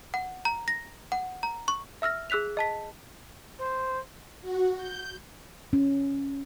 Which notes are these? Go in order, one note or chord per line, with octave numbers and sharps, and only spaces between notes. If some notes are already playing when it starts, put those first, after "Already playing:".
F#5
A#5
A#6
F#5
A#5
C#6
E5 E6 F6 A#6
G#4 E6 F#6 B6 F7
D#5 A5 B6
C5
F#4
G6
C#4